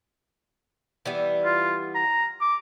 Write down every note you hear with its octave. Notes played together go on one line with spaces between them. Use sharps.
E3 G3 B3
F4
A#5
D6